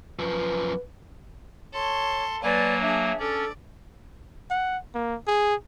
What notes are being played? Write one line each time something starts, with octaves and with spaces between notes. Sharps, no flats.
F#2 F3 B4
A4 C#5 C6
F#3 A#3 B4 D5 G#5
D4 G#4 E5
C#4 A4 D5
F#5
A#3
G#4